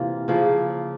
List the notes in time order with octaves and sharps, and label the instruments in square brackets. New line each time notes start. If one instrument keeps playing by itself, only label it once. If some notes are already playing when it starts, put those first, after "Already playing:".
Already playing: [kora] C3 E3 A#3 F4
C#3 F3 A#3 E4